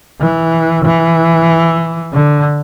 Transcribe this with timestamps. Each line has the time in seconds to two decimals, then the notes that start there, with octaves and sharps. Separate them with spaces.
0.21 E3
0.85 E3
2.13 D3